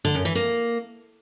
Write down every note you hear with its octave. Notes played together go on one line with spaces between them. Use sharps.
D3
F#2
E3
A#3